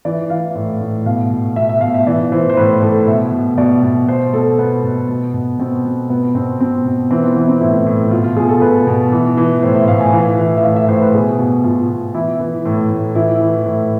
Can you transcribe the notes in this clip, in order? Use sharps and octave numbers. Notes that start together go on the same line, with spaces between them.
E3 D5
E3 F5
A2
A2
B2 F5
B2
B2 E5
E5
B2 F5
E5
E3 D5
E3 C5
C5
A2 B4
A2 A4
B2 E5
B2
B2 D5
B2
B2 C5
B2 A4
B2 B3
B2
B2
B2
B2 C4
B2
B2 B3
B2 C4
B2 C4
B2
E3 C4
B3
E3 B3
C4
A2 E4
A2
B2 F4
F4
B2 G#4
A4
B2 B4
B2
E3
E3
A2 C5
E5
A2 F5
G#5
E3 F5
E3
E5
A2 F5
E5
A2 C5
B4
B2 G#4
B2
B2 F4
B2
E3 E4
E3
A2
A2
E3 E4
E3
A2